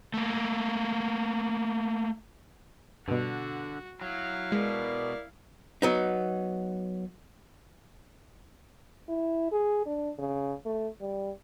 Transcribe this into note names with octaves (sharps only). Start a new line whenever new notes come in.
A3 A#3
G2 B2 D3 F#4
F#3 E4 F5
B2 G#3 A#4 D5
F#3 B3 D#4
E4
G#4
D4
C#3
A3
G3